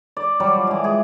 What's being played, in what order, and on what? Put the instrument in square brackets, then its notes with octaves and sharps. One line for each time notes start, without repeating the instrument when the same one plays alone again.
[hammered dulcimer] D5
F#3 G3 D5
F3
E3 G#3
G#4